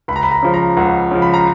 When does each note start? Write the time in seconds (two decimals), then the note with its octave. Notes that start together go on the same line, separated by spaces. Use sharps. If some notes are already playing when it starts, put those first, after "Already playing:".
0.08 C#2 B5
0.16 A#5
0.23 B5
0.31 A#5
0.43 C#3 F3
0.54 A#5
0.77 C#2 F#5
1.11 C#3 F3
1.22 B5
1.34 A#5